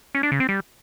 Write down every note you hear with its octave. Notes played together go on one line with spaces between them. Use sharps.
C#4
D4
C#3
C4
G3